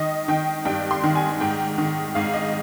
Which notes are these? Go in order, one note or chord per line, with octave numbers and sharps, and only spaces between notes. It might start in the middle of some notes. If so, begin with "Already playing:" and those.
Already playing: D#3 D#5
D#3 G5
G2 G5
C6
D#3
G#5
G#2 G5
D#3
G#2 F5
D#5